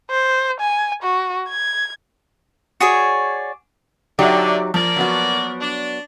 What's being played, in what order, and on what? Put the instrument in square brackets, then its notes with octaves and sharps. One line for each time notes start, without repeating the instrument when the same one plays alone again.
[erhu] C5
G#5
F#4
G#6
[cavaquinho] F#4 G#4 C#5 D5
[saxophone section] D3 [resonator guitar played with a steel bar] F#3 D#4 G4 [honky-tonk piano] D5 E5
[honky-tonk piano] F3 [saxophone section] A#3 A#4 D5
[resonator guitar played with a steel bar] F#3 B3 F#4
[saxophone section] D4